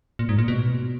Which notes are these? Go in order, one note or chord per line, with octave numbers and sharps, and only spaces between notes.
A#2
G#2
A#2
B2